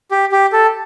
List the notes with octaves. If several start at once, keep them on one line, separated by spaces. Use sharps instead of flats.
G4
G4
A4